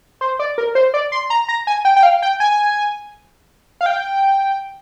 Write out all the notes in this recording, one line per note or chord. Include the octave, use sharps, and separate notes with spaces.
C5
D5
A#4
C5
D5
C6
A#5
A#5
G#5
G5
G5
F5
G5
G#5
F5
G5